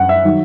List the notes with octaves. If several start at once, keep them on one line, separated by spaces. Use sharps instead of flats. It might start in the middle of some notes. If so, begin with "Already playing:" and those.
Already playing: F#2 F#5
E5
D#3 F#3